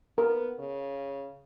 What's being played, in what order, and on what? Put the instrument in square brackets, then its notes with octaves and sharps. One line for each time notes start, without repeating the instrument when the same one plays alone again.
[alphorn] B3 [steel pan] A#4
[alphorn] C#3